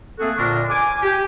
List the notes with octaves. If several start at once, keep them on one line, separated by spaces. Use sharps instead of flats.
A3 A#3 C4 F#4 G#4 A4
F2 A#2 D3 D4 A#4 C#6
G#5 D6
G4